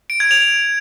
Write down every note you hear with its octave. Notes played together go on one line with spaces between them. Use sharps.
D7
G#6
F7